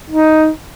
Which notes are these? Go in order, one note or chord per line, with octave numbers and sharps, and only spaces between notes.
D#4